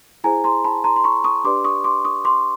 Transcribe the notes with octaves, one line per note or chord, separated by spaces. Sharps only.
E4 G#4 C5 G#5 A#5
A#5 C6
A5 B5
A#5 C6
C6
B5 C#6
C#6 D#6
D4 G4 B4 D5 C6 D6
C#6 D#6
C6 D6
C#6 D#6
C6 D6